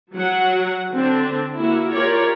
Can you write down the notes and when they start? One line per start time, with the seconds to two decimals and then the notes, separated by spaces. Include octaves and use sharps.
0.14 F#3 F#5
0.93 D3 C4 D4
1.57 A#3 E4 F#4
1.92 F4 G4 A#4 C#5 D5